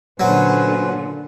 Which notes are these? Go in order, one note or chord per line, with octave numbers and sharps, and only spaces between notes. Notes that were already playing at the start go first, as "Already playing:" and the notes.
A#2 D3 F#3 C#4 B4 C5